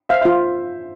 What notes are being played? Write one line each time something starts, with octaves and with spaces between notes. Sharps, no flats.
C5 E5 F5
C5 E5
F4